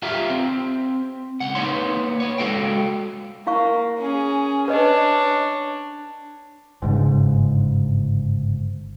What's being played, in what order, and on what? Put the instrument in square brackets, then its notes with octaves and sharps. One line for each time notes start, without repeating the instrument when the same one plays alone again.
[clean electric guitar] F4 G4 A#4 E5 F5
C4
C#2 F#5
A#3 B3 D#4 C#5 C6
B3 C#5
G#3 F#4 A4 F5 G5
[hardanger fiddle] A#3 [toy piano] E4 F5 C#6
[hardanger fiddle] C#4 G#4
[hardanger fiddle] D4 C#5 [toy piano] B4 D#5
[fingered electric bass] G1 G#2 C#3